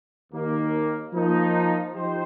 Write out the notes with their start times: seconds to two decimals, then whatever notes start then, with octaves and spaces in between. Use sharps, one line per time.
0.33 D#2 D#3 A#3
1.13 F3 A#3 D#4
1.94 F3 D#4 G4 C5